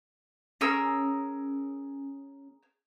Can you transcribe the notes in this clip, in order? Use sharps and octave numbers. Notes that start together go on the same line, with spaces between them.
C#4 G#4 A#4 E6